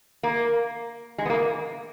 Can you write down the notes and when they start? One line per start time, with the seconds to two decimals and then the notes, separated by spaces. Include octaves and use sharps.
0.23 A#3
1.18 G#3
1.25 B3
1.30 A#3